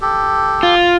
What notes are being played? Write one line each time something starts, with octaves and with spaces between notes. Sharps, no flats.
G4 A4
F4